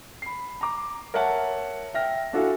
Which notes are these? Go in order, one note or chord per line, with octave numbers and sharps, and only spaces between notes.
B5 C7
A#5 D6
A#4 C#5 E5 F#5 A5
E5 G5 F6 A#6
D4 E4 F#4 A4 F5 G#5